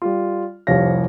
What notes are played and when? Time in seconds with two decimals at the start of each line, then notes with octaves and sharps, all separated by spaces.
0.02 G3 F4
0.67 F1 C2 F3 C#5 F5 A#6